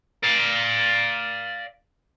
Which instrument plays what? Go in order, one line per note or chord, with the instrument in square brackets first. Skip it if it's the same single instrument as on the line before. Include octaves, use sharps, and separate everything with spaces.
[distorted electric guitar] D5 F5